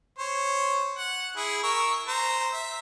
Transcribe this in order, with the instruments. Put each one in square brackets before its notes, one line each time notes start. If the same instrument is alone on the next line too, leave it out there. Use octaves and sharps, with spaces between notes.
[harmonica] C5 C#5
F#5
E4 G#4
A#4 C#6 E6
C5 A#5
E5